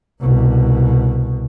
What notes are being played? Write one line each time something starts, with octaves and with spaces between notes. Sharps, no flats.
C2 B2